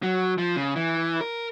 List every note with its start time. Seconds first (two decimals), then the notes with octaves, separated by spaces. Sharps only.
0.03 F#3
0.38 F3
0.56 C#3
0.76 E3
1.21 A#4